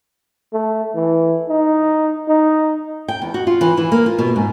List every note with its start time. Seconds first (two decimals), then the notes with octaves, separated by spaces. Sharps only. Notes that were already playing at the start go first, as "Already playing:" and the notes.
0.53 A3
0.95 E3
1.49 D#4
2.28 D#4
3.08 G5
3.22 E2
3.34 F#4
3.47 F4
3.61 E3
3.77 E3
3.92 A#3
4.06 F4
4.19 B2
4.36 G#2